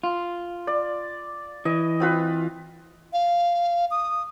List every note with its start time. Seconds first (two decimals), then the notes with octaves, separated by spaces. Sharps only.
0.04 F4
0.67 D5
1.65 E3 D#5
2.00 C4 F4 B4
3.13 F5
3.91 D#6